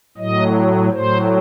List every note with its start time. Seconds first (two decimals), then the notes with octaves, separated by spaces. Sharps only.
0.17 A2 F#3 D#5
0.92 A2 F#3 C5